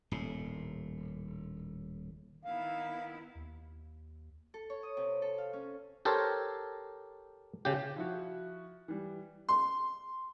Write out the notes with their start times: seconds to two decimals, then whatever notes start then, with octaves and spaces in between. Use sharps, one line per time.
0.11 D#1 A2
2.45 D#3 B3 E4 F5
3.35 D#2
4.54 A4
4.70 C#5
4.83 D#6
4.97 C3
5.22 A4
5.38 F5
5.53 C#4
6.05 G4 A4 A#4 C5 C#5
7.65 C#3 G4
7.96 F3 E4 F#4
8.88 E3 G3
9.49 C6